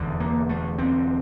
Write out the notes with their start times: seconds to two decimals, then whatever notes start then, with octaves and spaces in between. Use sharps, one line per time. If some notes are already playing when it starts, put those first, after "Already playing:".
Already playing: E1 E2 D3
0.20 A#3
0.49 A3
0.78 C4